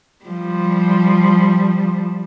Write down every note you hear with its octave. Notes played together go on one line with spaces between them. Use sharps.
F3 G3